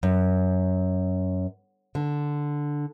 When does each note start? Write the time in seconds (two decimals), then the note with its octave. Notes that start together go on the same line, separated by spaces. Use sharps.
0.03 F#2
1.95 D3